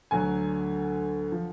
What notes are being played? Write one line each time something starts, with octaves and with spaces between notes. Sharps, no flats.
D2 D3 F#3 G#5
F3